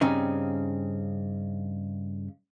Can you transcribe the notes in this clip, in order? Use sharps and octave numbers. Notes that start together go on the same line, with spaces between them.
G2 C#3 C4 C#4 D#4